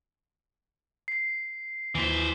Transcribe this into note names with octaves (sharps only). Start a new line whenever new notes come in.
C7
D#2 E3 C5 B6